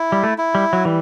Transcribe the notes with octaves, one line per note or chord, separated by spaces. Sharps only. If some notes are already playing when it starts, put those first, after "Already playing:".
Already playing: E4
G3
A3
E4
G3
F#3
E3 G3